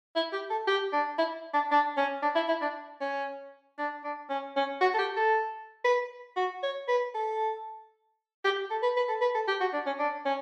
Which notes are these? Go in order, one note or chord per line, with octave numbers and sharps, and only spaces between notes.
E4
G4
A4
G4
D4
E4
D4
D4
C#4
D4
E4
E4
D4
C#4
D4
D4
C#4
C#4
F#4
A4
G4
A4
B4
F#4
C#5
B4
A4
G4
A4
B4
B4
A4
B4
A4
G4
F#4
D4
C#4
D4
C#4